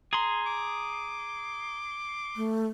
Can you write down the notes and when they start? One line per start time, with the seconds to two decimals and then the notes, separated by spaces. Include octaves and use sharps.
0.13 G#4 A#5 C6
0.46 D6
2.36 A3